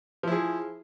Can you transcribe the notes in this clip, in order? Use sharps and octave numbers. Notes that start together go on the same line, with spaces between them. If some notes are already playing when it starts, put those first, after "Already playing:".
F3 E4 G#4